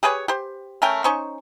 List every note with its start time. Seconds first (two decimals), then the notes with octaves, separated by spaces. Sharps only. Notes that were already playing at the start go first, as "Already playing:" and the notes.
0.03 G4 G#4 B4 C#5
0.28 G4 C5
0.82 A3 C#4 A#4 G5
1.04 C#4 D#4 C5 C#6